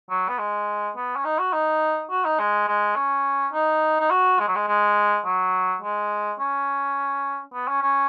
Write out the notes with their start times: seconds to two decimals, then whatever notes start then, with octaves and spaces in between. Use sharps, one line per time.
0.10 F#3
0.29 B3
0.39 G#3
0.97 B3
1.17 C#4
1.25 D#4
1.39 F#4
1.53 D#4
2.11 F#4
2.25 D#4
2.39 G#3
2.68 G#3
2.96 C#4
3.53 D#4
4.00 D#4
4.11 F#4
4.39 G#3
4.48 F#3
4.56 G#3
4.68 G#3
5.25 F#3
5.82 G#3
6.39 C#4
7.54 B3
7.68 C#4
7.83 C#4